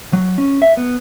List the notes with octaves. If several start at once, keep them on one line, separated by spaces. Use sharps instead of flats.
F#3
C#4
E5
B3